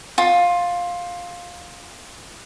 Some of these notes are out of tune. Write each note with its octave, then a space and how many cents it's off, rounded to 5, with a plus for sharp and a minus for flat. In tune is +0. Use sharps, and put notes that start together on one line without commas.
F4 +10